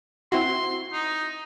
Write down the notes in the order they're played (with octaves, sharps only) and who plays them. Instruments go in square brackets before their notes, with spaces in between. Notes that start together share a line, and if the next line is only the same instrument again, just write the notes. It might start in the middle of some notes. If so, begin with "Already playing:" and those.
[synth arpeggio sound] C4 E4 F#4 [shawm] C6
[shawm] D#4